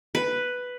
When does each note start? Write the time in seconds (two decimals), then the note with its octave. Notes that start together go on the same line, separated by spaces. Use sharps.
0.15 B4